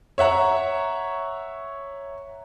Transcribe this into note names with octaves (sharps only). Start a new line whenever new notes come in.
C#5 E5 F#5 A#5